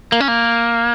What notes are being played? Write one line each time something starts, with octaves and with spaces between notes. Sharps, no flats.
A#3
C#4
A#3